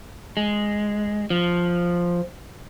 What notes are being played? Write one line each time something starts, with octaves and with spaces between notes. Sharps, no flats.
G#3
F3